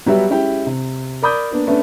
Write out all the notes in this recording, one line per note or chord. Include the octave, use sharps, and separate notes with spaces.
F#3 G3 B3 F#4 G4 E5
G#3 C#4 E4 G4 G5
C3
A#4 D5 B5 D6 D#6 G6
A#3 B3 D4
A3 B3 C#4 D4